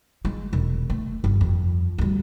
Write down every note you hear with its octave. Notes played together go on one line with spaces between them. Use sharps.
G#3
E1
A3
G1
F2
D2 G3